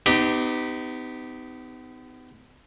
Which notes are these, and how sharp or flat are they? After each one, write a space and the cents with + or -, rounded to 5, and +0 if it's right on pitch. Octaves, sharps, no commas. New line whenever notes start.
B3 +40 D#4 +0 G4 +0